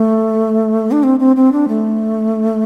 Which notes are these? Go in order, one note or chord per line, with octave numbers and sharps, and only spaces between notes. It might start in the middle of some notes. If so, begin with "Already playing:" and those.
Already playing: A3
D4
C4
C4
C4
D4
A3